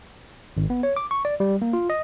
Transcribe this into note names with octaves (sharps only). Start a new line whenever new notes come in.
G#1
B3
C#5
D6
C#6
D5
G3
A#3
F4
D#5